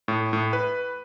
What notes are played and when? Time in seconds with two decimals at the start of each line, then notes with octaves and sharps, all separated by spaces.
0.08 A2
0.33 A2
0.53 B4